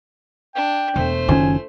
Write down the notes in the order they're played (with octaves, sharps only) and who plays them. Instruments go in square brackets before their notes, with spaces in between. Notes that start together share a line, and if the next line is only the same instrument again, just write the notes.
[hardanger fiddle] D4 [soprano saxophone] G5
[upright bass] E1 [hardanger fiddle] A3 C5
[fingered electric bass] F#1 D#3 C#4 [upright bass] F4 [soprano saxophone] G#5